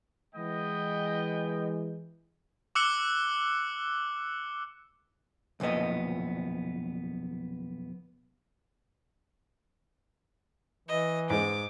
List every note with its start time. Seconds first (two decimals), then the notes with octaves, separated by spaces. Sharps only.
0.35 E3 G#3 B3 D#5 G5
2.75 D6 E6 F#6 C#7 G7
5.60 B1 F2 A#2 B3 D#5
10.88 E3 D#5
11.30 G#2 G#3 D6